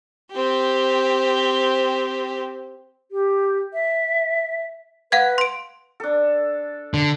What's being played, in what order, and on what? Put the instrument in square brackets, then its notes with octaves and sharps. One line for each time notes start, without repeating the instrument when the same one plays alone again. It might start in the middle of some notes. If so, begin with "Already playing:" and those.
[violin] C4 G4
[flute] G4
E5
[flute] B4 [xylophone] F5 F#5 G#6
[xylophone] C6 D7
[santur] D4 A4
[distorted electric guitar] D3